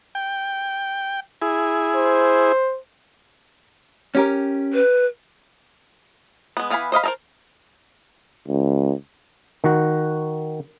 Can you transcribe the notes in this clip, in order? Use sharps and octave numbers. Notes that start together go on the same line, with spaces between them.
G5
E4 G#4
C5
C#4 G4 A#4
B4
G#3 B3
E3 B3 F5 G#5 B5
C5 D#5 F5 B5
A#4 C5 E5 A5 A#5
C#2
D#3 F#4